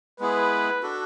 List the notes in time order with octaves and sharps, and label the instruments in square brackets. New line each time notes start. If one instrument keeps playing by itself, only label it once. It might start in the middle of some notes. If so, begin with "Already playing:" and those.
[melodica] G#3 B3 E4 G#4 [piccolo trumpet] B4
[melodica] D4 F#4 A4